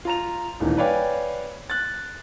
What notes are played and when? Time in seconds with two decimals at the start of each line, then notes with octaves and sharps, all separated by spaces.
0.05 F4 A#5 F7
0.60 D#1 D#3 E3
0.77 B4 C#5 D5 F5 G5 G#5
1.70 F#6 A6